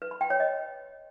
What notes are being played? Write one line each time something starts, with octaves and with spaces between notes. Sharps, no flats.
B4
B5
G5
C#5
D#5